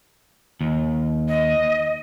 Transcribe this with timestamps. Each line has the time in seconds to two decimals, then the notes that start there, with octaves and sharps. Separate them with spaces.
0.61 D#2
1.28 D#5